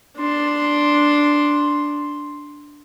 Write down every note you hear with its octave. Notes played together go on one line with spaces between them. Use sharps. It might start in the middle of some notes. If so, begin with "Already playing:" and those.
D4 C6